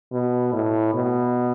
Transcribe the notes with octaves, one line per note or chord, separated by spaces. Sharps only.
B2
A2
B2